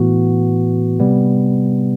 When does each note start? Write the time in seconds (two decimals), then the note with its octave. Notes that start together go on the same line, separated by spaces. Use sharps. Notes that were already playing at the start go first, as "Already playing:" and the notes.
Already playing: A2 E3 B3 F#4
0.99 C3 G3 B3